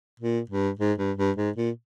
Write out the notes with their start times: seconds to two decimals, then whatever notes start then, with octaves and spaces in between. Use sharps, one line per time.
0.20 A#2
0.50 G2
0.79 G#2
0.98 G2
1.17 G2
1.37 G#2
1.56 A#2